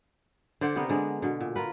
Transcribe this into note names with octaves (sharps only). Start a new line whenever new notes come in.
D3 C5 D5 F#5
C3 B3 A#4
D3 G#3 D5
B2 D3
A#2
F4 A#4 B4